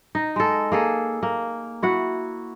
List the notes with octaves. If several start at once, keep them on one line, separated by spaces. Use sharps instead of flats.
D#4
G#3 A4
A#3 G#4 A4
A#3
E4 F#4 F#5